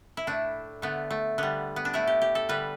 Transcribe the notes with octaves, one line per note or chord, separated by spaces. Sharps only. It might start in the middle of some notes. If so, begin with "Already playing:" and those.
E4
A2 A3 D4
D3 A3 B3
A3
D3 G3 B3
B3
D4
A2 A3 E4
G4
G4
A4
D3 G3 B4